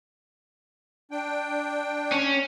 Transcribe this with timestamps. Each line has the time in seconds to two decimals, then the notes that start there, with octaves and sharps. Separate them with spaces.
1.11 D4 G5
2.12 C#4